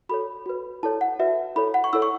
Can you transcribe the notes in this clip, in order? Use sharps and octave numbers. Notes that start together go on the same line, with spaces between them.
F#4 A4 C#5 B5
F#4 B4
E4 A4 C#5 A5
F#5
F#4 B4 E5
E4 A4 C#5 B5
F#5
C#6
E4 A4 C#5 E6
C#6